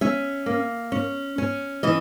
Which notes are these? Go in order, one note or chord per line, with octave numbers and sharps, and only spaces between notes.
C#4 E5
A#3
C#4
C#4
E3 D#5